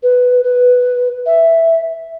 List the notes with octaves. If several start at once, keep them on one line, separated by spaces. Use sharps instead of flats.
B4
B4
E5